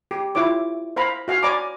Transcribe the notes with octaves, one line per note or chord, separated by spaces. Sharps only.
G4
E4 F4 C#5 D6
C5 F5 A#5 B5
F#4 F5 G#5
C#5 D5 G#5 A#5 B5 D6